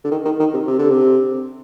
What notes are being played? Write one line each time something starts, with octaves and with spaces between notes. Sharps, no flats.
D3
D#3
D#3
D#3
C3
C3
D3
C3